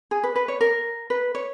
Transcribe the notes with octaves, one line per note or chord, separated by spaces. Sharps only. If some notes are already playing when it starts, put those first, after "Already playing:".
G#4
B4
B4
C#5
A#4
B4
C#5